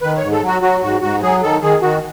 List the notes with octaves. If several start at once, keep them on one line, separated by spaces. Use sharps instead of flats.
D#3 B4
G#2 C#5
A4
F#3
F#4
F#3 F#4
G#2 F#4
G#2 F#4
F#3 G#4
D#3 A4
D#3 G#4
D#3 F#4